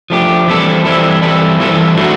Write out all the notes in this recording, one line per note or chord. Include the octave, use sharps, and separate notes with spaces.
F3 A3 D4 G4
E3 G3 C4 E4 A4
E3 G3 C4 E4 A4
E3 G3 C4 E4 A4
E3 G3 C4 E4 A4
F#3 A3 D4 F#4